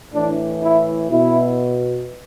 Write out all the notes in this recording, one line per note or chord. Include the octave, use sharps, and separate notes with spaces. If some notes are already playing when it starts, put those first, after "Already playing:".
A2 E3 D4
E4
B2 E4